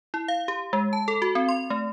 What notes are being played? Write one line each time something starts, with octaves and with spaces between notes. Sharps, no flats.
E4
F5
G4
G#3
A5
A4
F#4
C4
C6
A3